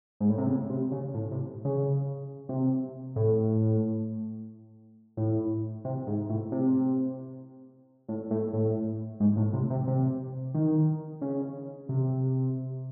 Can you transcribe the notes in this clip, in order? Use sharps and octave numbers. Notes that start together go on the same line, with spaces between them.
G#2
A2
C3
C#3
C3
C#3
A2
C3
C#3
C3
A2
A2
C3
G#2
A2
C3
A2
A2
A2
G#2
A2
C3
C3
C3
D#3
C#3
C3